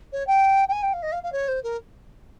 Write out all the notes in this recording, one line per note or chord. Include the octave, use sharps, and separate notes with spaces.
C#5
G5
G5
G#5
G5
F5
D#5
F5
F5
C#5
C5
A#4